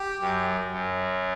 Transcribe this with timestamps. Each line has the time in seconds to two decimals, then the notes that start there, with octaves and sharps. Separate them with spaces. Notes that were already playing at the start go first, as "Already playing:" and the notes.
Already playing: G4
0.20 F#2
0.71 F#2